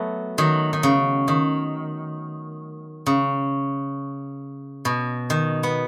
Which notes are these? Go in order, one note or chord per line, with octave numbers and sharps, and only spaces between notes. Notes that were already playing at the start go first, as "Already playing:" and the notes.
Already playing: F#3 A3 B3
D#3 F#3
D#3
C#3
D#3
C#3
B2
D#3
B3